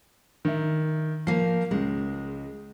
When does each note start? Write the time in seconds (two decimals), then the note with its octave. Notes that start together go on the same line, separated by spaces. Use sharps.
0.45 D#3 E5
1.27 F3 A#3 C7
1.71 C#2 G#3